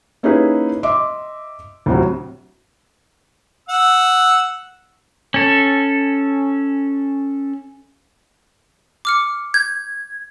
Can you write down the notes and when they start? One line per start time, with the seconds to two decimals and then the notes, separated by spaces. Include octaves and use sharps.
0.23 A#3 C#4 D#4 E4 G#4 B4
0.83 D#5 E5 C6 D6
1.86 D2 A2 C3 F#3
3.69 F#5 E6
5.34 C#4 A4
9.05 D6 F6 C#7
9.54 G6 G#6